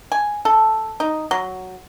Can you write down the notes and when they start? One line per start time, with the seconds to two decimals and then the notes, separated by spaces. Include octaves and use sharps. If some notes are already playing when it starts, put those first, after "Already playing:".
0.12 G#5
0.45 A4
1.00 D#4
1.31 F#3